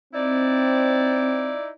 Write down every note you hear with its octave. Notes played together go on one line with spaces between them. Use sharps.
C4 D#4 E4 D5